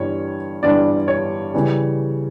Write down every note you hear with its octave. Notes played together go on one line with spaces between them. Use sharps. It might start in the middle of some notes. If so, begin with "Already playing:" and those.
Already playing: G1 G2 E3 G3 C#5
G1 G2 E3 G3 D5
C#5
C#3 E3 G3